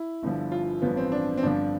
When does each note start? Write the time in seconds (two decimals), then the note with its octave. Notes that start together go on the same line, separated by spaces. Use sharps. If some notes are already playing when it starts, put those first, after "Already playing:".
Already playing: E4
0.22 G1 G2 D3 F3
0.52 F4
0.82 A1 G2 F3 B3
0.97 C4
1.12 D4
1.37 C4
1.43 G1 G2 D3 F3 D4